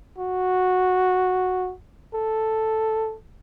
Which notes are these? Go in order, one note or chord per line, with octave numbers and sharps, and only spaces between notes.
F#4
A4